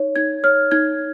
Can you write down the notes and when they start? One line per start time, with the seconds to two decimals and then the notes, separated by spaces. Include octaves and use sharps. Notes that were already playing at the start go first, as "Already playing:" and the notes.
Already playing: D#4 C#5
0.16 D#4 G#6
0.44 C#5 F6
0.71 D#4 G#6